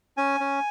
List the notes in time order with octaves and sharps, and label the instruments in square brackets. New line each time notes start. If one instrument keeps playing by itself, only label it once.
[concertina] C#4 G#5
C#4